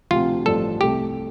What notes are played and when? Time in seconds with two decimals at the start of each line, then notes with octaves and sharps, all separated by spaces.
0.11 D2 C3 F3 C4 F4 G4
0.46 A1 G2 F3 D4 A4
0.81 C2 C3 A3 G4